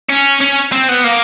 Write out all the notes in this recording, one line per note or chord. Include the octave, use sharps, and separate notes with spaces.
C#4
C#4
C4
B3
A#3